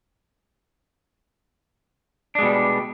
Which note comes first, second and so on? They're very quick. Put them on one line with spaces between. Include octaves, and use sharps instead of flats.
D4 G#3 B2 G3